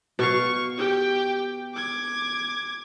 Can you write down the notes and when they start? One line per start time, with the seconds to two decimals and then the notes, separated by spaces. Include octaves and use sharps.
0.19 B2 F5 C#6
0.77 G4 G5
1.74 D6 G#6